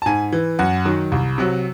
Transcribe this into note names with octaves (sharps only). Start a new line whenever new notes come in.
A5
G#2 G#5
E3
F#2 F#5
D#3 F#3
C2
C3 F#3